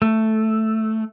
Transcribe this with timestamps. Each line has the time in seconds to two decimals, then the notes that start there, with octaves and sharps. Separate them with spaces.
0.02 A3